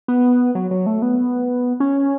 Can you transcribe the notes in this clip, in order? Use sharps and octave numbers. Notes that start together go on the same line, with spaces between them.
B3
F#3
F#3
A3
B3
C#4